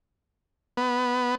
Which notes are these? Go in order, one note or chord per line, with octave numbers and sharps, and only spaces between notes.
B3